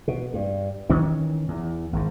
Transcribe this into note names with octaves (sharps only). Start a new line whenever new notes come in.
B2
G2
D#3 E3 C#4
E2
G#1 G#2